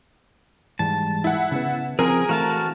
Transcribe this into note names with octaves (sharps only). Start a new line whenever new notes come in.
G#2 E3 G3 A5
E4 F#5
C#3 B3
F3 C4 G#4 A#4
E3 A3 F#4 C5 F5 A5